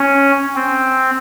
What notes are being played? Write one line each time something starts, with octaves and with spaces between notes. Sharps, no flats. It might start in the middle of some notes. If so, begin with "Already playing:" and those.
Already playing: C#4
C4